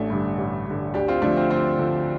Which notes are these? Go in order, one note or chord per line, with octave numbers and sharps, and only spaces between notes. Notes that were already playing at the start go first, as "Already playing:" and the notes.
Already playing: A1 A3 D4
G2 D3
A1
G2 D3
D2 D4 G4
C4 F4
D3 F3 A3 D4
C4 F4
D2 C4 F4
D3 F3